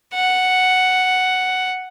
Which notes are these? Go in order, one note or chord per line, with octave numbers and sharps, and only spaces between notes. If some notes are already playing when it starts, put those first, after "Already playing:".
F#5